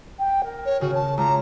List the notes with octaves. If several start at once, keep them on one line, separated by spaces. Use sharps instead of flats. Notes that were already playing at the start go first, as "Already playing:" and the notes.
G5
A#4
C#5
C#3 F#4
A5
C#2 A5 A#5